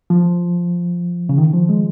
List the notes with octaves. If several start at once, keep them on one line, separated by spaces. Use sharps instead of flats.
F3
C#3
D#3
F3
G#3